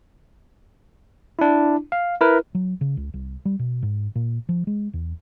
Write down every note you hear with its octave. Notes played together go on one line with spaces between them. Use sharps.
D4 E4
F5
E4 A#4 B4
F#3
C#3
C#2
C2
G3
B2
G#2
A#2
F3
G#3
E2